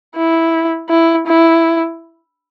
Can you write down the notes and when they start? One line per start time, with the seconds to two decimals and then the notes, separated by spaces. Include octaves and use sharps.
0.16 E4
0.89 E4
1.27 E4